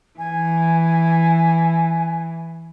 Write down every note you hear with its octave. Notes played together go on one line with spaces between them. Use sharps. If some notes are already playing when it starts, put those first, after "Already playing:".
E3 G#5